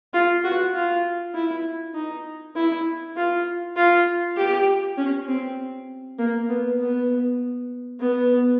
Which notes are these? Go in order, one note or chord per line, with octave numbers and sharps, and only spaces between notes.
F4
F#4
F4
E4
D#4
E4
F4
F4
G4
C#4
C4
A#3
B3
B3
B3